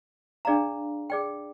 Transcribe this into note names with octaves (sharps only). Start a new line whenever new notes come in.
D4 G#4 D5 F5 A#5
G#4 D5 G5